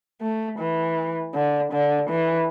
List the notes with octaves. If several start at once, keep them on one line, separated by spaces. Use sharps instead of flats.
A3
E3
D3
D3
E3